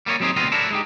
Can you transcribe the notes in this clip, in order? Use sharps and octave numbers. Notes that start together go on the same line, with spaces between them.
G3 A#3 G#4 C#5 D#5
F#3 G3 C4 D#4 G4 G#4
D2 B2 B3 C4 F4 D#5
D4 E4 F#4 A4 A#4
G#3 D#4 G4